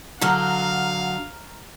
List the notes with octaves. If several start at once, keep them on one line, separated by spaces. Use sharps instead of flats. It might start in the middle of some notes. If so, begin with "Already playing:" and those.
D3 F#3 F5 A#5 F6